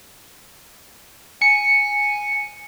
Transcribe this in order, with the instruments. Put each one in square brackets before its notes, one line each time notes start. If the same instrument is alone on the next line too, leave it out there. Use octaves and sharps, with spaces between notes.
[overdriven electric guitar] G#5 [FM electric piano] C#7